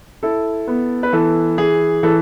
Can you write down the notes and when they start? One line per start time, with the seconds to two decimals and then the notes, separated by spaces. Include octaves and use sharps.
0.23 E4 A4
0.68 B3
1.03 B4
1.13 E3 A4
1.58 E3 G#4
2.03 E3 A4